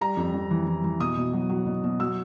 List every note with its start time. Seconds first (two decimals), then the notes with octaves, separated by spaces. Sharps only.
0.01 G3 A#5
0.17 F2
0.34 F2
0.51 E3
0.67 E3
0.84 E3
1.00 B2 D#6
1.17 B2
1.33 F#3
1.49 F#3
1.66 B2
1.84 B2
1.99 F#3 E6